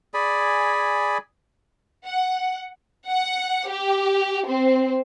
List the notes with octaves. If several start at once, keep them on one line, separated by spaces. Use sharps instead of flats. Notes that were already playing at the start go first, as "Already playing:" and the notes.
G#4 D5 G#5 B5
F#5
F#5
G4
C4